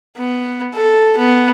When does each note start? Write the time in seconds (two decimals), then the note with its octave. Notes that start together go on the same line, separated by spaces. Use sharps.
0.17 B3
0.74 A4
1.18 B3